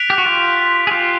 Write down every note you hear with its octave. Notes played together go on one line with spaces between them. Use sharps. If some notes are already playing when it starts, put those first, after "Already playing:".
Already playing: F#6 B6 D7 F7
G4
F#4
F4 G4
G#4
F4 G4